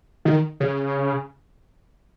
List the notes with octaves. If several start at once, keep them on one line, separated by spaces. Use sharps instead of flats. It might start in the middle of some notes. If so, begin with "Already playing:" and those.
D#3
C#3